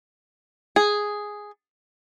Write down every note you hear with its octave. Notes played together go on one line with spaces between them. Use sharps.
G#4